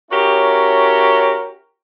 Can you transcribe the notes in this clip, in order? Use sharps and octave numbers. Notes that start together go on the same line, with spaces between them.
C#4 E4 F#4 G4 A#4 C#5